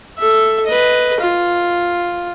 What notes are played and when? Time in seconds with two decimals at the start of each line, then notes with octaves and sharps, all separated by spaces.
0.18 A4 E5
0.66 B4 D#5
1.20 F4